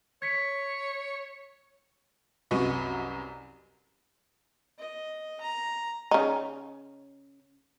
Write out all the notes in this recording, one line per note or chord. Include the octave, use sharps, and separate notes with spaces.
C#5 G#6 B6 C#7
C2 F#2 F#3 B4 D#5 C#6
D#5
A#5
C#3 D#4